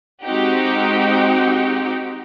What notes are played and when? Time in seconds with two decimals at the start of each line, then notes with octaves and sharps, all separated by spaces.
0.24 G#3 C4 D#4 F#4 G4 F#5